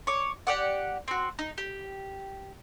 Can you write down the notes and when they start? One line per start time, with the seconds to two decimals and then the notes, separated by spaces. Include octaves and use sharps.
0.07 C#5 D6
0.47 G4 D5 F#5
1.08 C4 F#4
1.39 D#4
1.58 G4